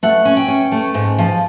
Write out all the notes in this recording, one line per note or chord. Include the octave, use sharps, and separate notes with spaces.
A3 F#5
C#4
G5
C#4
A3
G#2
F3